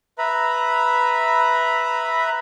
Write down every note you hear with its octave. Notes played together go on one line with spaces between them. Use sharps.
B4 E5 A#5 B5